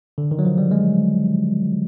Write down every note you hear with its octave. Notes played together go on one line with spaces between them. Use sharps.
D3
D#3
F#3
F3
G3
G#3